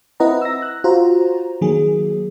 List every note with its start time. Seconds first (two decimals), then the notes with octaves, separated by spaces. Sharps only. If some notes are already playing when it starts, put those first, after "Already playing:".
0.20 C4 E4 B4 D#5 F#5 A#5
0.42 E6 A#6
0.62 F#6
0.84 F4 F#4 C5 A#5
1.61 D#3 F#3 A#3 G#4